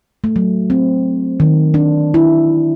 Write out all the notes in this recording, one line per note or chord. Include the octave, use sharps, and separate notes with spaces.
A3
F#3
C4
D#3
D4
E4